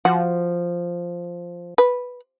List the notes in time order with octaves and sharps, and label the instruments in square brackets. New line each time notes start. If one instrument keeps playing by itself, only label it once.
[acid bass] F3 [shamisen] F#4
[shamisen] B4